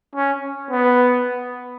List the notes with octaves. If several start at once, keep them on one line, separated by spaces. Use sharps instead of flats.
C#4
B3